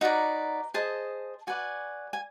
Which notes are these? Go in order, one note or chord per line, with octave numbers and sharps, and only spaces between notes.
D#4 F#4 B4 D5 A#5
G#4 C5 D#5 A5
F#4 B4 D5 G#5
G#5